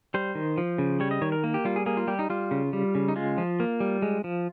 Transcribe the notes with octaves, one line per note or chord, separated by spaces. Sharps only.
G3 C5
D#3
F3
C#3
G3 C#5
D#5
D#3 C#5
A#4
A#3
G4
G3 F4
G#4
A#3 G#4
F4
G3 G4
D#4
G3 F4
C#3
G3
C#3
D#4
G#3 F4
F3
A#3
G3
G#3
F3